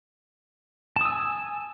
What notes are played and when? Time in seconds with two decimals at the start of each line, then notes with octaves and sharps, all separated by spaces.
0.96 A5
1.01 D#6
1.05 E6
1.10 G#5